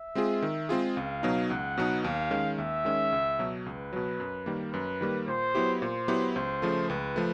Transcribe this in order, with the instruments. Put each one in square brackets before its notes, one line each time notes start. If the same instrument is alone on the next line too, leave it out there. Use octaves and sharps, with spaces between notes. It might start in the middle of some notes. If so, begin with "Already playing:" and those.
Already playing: [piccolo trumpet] E5
[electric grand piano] G#3 C4 F4 G#4
D#3
G#3 C4 F4 G#4
[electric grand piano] C#2 [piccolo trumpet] F5
[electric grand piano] B2 F#3 B3 D#4
[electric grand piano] C#2 [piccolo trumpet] F#5
[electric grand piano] B2 F#3 B3 D#4
[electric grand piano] D#2 [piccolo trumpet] F5
[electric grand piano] D#3 G#3 C#4
[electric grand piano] D#2 [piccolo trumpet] E5
[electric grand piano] D#3 G#3 C#4
C#2
B2 F#3
[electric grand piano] C#2 [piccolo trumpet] B4
[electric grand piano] B2 F#3
F#2
D#3 G3 A#3
[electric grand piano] F#2 [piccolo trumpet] B4
[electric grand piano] D#3 G3 A#3
[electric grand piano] A#2 [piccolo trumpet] C5
[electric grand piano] F#3 B3 E4 G4
[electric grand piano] A#2 [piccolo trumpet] C5
[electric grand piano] F#3 B3 E4 G4
[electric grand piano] C#2 [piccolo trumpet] C5
[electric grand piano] C#3 F3 A3
[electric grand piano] C#2 [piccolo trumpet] B4
[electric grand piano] F3 A3